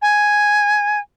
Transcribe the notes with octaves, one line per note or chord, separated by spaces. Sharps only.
G#5